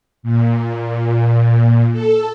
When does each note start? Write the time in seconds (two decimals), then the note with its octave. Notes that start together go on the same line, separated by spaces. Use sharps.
0.23 A#2
1.92 A4